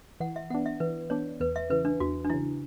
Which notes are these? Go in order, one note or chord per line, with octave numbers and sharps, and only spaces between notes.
E3 F#5
E5
B3 D4 F#5
E5
E3 B4
B3 D4 C#5
E2 B4
E5
C#3 E3 B4
D4
E2 F#4
D4
C#3 E3 E4